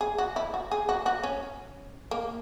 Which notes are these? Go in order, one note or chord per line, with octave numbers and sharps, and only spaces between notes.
G#4
F#4
E4
F#4
G#4
F#4
F#4
C#4
A#3